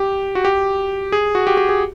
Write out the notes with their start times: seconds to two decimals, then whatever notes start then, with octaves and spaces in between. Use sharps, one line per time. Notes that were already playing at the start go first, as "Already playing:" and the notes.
Already playing: G4
0.35 F#4
0.45 G4
1.12 G#4
1.35 F#4
1.47 G4
1.57 G4
1.69 G#4